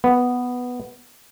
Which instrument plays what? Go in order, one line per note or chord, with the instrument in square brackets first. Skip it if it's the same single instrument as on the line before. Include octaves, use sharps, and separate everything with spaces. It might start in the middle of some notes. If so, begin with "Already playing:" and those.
[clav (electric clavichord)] B3